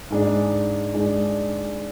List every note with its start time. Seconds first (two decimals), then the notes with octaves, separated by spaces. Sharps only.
0.11 G#2 G#3 D4
0.94 G#2 G#3 D4